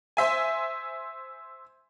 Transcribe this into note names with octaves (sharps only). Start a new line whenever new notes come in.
C5 E5 G#5